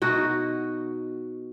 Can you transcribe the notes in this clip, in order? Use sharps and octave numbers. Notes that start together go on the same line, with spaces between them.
B2 D#4 F#4